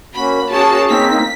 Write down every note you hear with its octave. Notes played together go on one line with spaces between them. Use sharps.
A#3 C#4 F#4 B5
A#3 C#4 F#4 G#4 C#5 A5
A#3 C4 D#4 B6